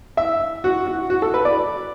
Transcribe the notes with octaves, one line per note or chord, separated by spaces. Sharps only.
E5
F#4
F#4
F#4
A4
B4
D5